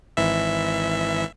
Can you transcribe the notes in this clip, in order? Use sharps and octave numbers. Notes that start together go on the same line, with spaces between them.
G#1 E3 E5